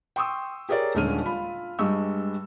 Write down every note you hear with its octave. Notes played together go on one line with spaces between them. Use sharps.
G5 C6 C#6 D#6 E6
G4 G#4 A#4 C#5 D5
D#1 D3 G#3 C#4 F6 D#7
F4 B5
G2 G3 G#3 D#5 C#6 E6